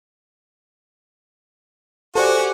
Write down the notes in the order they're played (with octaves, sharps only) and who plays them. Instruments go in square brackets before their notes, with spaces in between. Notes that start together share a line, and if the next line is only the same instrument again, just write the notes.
[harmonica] F#4 [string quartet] G4 F#5 G#5 [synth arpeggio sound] A4 C5 D5